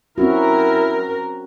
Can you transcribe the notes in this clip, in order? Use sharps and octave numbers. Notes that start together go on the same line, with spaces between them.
C4 C#4 E4 F#4 A#4